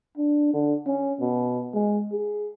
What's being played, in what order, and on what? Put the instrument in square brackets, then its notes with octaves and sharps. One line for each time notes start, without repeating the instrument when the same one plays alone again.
[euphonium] D4
D3
C#4
B2
G#3
G#4